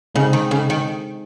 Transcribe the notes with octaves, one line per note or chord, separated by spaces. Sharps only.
C#3 G#3 C4 D#4 G#4
D#3
C#3
D#3